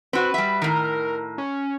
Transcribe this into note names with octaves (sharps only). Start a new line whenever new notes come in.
C4 F#4 B4
G3 E5
A2 D#3 A#4
C#4